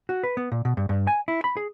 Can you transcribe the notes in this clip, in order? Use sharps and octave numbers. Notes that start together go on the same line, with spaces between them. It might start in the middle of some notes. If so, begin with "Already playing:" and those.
F#4
B4
B3
A#2
B2
G2
G2
G#5
E4
B5
G#4